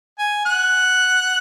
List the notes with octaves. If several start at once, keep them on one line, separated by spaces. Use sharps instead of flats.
G#5
F#5